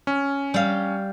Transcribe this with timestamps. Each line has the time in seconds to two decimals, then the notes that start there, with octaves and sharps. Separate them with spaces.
0.07 C#4
0.54 G3 F5